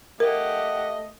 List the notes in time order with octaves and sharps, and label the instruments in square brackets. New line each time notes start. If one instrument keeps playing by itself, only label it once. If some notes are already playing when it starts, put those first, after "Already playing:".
[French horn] A3 [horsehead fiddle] G4 F#5 [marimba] A#4 [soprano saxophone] D#5